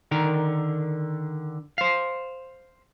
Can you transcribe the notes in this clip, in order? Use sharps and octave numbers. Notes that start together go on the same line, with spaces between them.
D3 D#3 A#4
C5 F5